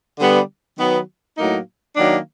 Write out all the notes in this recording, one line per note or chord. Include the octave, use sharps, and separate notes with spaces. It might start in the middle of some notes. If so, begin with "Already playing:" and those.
D3 G3 B3
D#3 F#3 B3
A2 F#3 A#3 D#4
D#3 F#3 A#3 D4